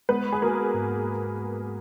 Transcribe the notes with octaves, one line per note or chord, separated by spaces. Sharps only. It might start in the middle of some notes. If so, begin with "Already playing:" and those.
G#3 B3 B4
G#4
A#3 F#4 A#4
G#2